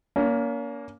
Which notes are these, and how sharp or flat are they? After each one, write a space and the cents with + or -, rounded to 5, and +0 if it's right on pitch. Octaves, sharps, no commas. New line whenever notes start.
A#3 +10 C#4 +40